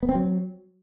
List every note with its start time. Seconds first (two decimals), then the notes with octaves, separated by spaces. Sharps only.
0.03 B3
0.09 C4
0.15 F#3